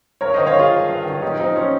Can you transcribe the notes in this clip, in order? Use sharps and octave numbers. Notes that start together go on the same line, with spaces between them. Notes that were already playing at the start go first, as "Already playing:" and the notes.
G2 A#4 C#5
C5 D#5
D#3
C#5 F5
D#3 F4 G#4
G2
G2
D#3
A#2 D#4 G4
F3 C4 D#4
F3 C#4